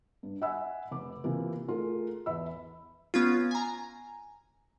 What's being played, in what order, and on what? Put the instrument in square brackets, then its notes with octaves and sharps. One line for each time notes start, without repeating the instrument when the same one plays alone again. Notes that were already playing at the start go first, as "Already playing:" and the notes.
[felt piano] G2
D#5 E5 F#5 G#5 B5 E6
F1 D6
C3 E3 A#3 F4 G4
A3 F4 G#4 A#4
E2 E5 B5 E6
[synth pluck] B3 C#4 F4
G#5 A#5